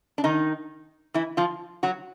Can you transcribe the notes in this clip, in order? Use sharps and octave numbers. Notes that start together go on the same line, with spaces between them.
D4
D#3 D#4
E3 E4
F3 F4
F#3 F#4